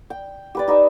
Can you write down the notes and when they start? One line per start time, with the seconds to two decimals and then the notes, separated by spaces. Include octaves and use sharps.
0.10 G5
0.55 G4 B4 D5
0.68 D#4 G4 B4 E5